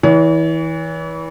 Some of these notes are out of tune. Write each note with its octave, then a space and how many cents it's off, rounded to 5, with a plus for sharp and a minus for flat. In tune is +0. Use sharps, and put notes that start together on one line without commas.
E3 -25 C#5 +40